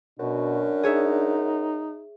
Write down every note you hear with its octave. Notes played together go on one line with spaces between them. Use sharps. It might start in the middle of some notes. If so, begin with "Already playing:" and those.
F#2 B2 D4
D#4 G#4 C#5 E5